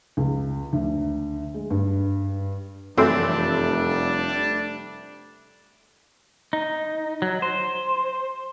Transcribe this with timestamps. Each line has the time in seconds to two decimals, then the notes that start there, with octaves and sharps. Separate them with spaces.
0.17 C#2
0.73 D2
1.54 G#3
1.70 G2
2.98 F1 F#2 E3 G3 A3 C4 D4
6.53 D#4
7.22 F#3
7.42 C5